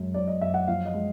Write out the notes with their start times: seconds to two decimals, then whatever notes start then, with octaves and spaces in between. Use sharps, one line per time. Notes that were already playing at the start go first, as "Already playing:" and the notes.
Already playing: F#2 G#3
0.14 F#2 D5
0.28 D#5
0.41 F#2 E5
0.54 F#5
0.68 F3 F5
0.85 D#5
0.94 G#3